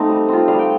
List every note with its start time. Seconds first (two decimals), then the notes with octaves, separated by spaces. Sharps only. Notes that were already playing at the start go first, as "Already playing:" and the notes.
Already playing: A3 C4 D#4 F5
0.09 G3
0.28 C4 F4
0.48 G3 F5
0.59 G5